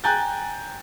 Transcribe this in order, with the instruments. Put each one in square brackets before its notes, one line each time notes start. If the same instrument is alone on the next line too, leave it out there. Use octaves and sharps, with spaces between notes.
[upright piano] G5 G#5 A#5 F#6 G6 A6